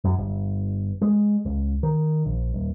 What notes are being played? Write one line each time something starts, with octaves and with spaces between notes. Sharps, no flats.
F#2
G1
G#3
C#2
D#3
A#1
D#1